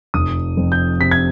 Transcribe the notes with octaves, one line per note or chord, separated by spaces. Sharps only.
F1 D#6
F2
G6
C3 B6
G#6